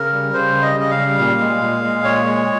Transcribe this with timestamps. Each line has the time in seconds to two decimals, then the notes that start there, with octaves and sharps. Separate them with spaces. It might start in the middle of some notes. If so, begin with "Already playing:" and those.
Already playing: C#3 A#4
0.13 G3
0.33 C#3 C5
0.55 G3
0.62 D#5
0.77 C#3 D#5
0.91 F5
0.97 G3
1.19 A#2
1.40 G#3
1.61 A#2
1.83 G#3
2.04 A#2 C#5
2.26 G#3